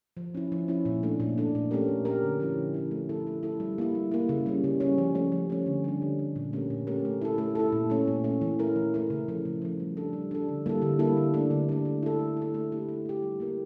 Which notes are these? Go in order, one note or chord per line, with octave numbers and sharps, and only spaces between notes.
F3
C#4 E4
F3
C#4 E4
A#2
A3 D4
A#2
A3 D4
A#2
A3 C#4 G4 A#4
A#2
A3 C#4 G4 A#4
D3
F3 C#4 E4
D3
F3 C#4 E4
A3
E4 A4
A3
E4 A4
G3
A#3 E4
G3
A#3 E4
C#3
G3 C#4
C#3
G3 C#4
F3
A3 C#4
F3
A3 C#4
D3
G3 D4
D3
G3 D4
A#2
A3 C#4 G4 A#4
A#2
A3 C#4 G4 A#4
A3
E4 A4
A3
E4 A4
A#2
A3 C#4
A#2
A3 C#4
E3
A3 E4 A#4
E3
A3 E4 A#4
C#3
F3 A3
C#3
F3 A3
G3
D4 A4
G3
D4 A4
D3
G3 A#3 E4 A4
D3
G3 A#3 E4 A4
D3
A3 D4
D3
A3 D4
A3
E4 A4
A3
E4
A4
A3
E4 G4
A3
E4 G4
G3
A#3 E4 A#4